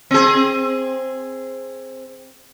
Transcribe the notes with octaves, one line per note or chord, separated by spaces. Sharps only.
C4 G#4